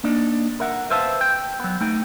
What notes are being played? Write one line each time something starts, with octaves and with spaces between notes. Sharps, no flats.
A#3 D4 D#4 D5
A#4 E5 F#5
B4 C5 E5 F5 A5
G5
F#3 B3
A3 D#4 G5